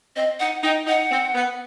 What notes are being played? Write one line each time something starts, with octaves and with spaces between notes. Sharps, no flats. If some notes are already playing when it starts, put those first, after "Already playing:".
C4 D#5
D#4 F#5
D#4 G5
D#4 F#5
C4
B3